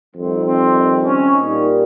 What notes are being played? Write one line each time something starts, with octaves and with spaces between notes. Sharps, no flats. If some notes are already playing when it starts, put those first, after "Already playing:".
F2 D#3 G3 C4
C4
C#4
A#2 G3 A#3 D#4